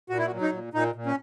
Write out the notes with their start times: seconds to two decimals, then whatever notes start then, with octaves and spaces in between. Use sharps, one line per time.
0.09 A#2 F#4
0.18 E4
0.27 F#4
0.32 F#3
0.41 D#4
0.52 A#2
0.73 A#2 D#4
0.95 A#2
1.06 C#4